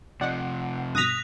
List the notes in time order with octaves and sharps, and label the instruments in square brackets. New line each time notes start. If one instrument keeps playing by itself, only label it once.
[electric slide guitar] C3 F3 [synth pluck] D5 D#5 [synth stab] F#5
[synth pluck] G2 B2 [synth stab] D#6 A#6 B6 [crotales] F#6 F7